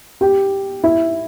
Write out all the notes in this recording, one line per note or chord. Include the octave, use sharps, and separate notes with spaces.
G4
E4